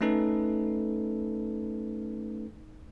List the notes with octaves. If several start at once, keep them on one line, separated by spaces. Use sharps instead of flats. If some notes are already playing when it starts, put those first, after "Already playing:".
A3 C#4 D#4 A4 B4